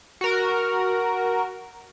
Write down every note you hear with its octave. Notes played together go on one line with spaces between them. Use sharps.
F#4 A#4